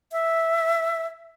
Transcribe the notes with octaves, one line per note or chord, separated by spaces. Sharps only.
E5